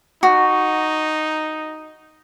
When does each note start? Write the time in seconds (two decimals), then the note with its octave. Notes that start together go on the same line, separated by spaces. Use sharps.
0.23 D#4 F#4